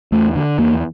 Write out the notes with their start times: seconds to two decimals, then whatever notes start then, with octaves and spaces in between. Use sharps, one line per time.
0.12 E2 A3
0.35 D3
0.58 E2 A#3